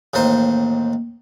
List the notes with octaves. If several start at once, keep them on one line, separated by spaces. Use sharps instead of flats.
A1 D#2 D#4 C5